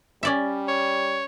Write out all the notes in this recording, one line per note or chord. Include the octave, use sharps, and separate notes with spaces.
G3 C#4 D5 E5
C#5